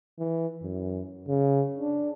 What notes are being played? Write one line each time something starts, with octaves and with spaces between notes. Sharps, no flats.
E3
F#2
C#3
D4